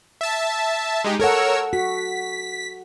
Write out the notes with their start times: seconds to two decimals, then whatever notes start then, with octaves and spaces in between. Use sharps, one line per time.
0.21 E5 A5
1.04 G#3 D#4 G4
1.20 A4 A#4 C#5 F#5 E6
1.73 F#4 B6